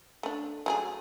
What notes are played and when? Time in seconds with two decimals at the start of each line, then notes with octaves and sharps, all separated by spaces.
0.23 A3 D4
0.66 F#3 A3 G#4